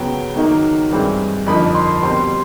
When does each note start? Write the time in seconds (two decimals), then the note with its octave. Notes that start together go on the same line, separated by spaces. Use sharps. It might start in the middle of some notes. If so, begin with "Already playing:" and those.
Already playing: C#3 F#3 B3 G5
0.36 G#2 D#3 F#3 A#3 D#4
0.91 G2 E3 G#3 C4
1.47 F2 D3 F3 A#3 D#4 B5
1.75 C6
2.03 B2 G3 C4 C6